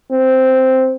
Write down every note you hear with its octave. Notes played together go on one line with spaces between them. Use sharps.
C4